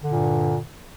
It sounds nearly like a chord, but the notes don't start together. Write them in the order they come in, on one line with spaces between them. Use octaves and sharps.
D3 G2 A#2